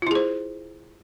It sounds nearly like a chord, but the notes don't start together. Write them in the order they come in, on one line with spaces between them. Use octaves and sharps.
F4 E4 G#4 C5